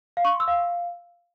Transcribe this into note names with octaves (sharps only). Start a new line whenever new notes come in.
F5
C#6
C6
E6
F5